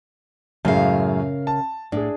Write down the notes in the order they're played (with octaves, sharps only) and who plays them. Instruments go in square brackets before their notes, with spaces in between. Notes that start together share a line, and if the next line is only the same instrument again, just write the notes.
[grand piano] F#2 A2 G#3 [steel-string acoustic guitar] C#3 A#4 F5
[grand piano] A5
[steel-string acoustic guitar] A2 [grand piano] D4 G#4